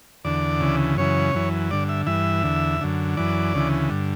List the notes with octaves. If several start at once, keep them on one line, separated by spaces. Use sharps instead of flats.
E2 D3 D5
D2 C#3 E3
F#2 C#3 E3 C#5
F#2 E3
G2 D3 D5
E5
G2 E3 E5
E2 D3
F#2 D3
F#2 E3 D5
D2 C#3 E3
G2 D3